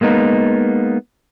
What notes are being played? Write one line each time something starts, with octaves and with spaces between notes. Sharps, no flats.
G#3 A#3 B3 D#4